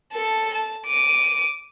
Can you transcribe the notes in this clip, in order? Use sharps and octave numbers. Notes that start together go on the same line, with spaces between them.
A4 A5
A5
D6 D#7